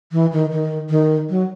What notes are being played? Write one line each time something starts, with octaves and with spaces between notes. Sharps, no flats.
E3
D#3
D#3
D#3
F#3